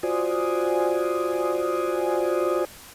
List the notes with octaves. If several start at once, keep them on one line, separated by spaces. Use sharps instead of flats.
F4 F#4 C5 D5 G#5 D#6